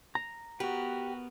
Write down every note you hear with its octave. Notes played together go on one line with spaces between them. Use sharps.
A#5
B3 F#4 G4 A#4 B4